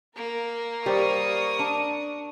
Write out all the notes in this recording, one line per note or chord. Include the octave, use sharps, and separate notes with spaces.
A#3 A#4
G3 G4 A#4 C5 D5 C#6 D#6
D4